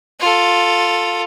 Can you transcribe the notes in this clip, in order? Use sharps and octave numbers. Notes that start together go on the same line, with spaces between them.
F4 A4